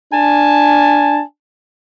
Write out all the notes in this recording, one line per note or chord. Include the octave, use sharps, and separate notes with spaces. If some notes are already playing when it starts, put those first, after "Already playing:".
D4 G#5 A5